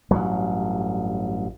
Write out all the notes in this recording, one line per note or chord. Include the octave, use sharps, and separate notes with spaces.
A1 G2 F#3